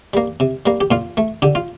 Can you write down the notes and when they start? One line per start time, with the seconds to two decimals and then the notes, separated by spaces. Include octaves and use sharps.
0.14 G3 A#3
0.40 C3
0.66 G3 A#3
0.81 G4
0.91 A#2 F4
1.17 A3
1.42 D3 G4
1.55 F4